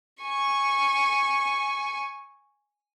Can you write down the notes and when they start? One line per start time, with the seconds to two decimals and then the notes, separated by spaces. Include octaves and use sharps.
0.23 G#5 C#6